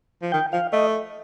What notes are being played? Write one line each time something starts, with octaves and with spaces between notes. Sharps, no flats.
F3
D#3 G5
F3 F5
A3 D#5